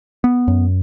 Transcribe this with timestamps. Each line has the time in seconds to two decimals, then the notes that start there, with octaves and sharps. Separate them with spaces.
0.24 B3
0.48 F#2